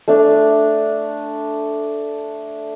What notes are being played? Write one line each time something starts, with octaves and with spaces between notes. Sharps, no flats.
A3 D4